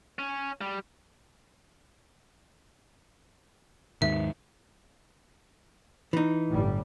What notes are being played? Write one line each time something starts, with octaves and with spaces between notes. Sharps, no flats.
C#4
G3
D#2 G#2 D#3 E5
E3 D#4
G1 A2 G3